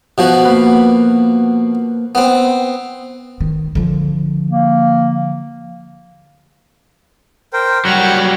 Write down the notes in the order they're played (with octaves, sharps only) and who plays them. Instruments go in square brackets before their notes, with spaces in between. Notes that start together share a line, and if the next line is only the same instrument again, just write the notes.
[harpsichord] B2 F3 F#4
[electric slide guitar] A#3 B4
[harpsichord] B3 C4
[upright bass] D#3
D3 F3
[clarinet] A#3
[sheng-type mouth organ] A#4 C5 G5
[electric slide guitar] F#3 G3 [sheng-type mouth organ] F#5 B5 C#6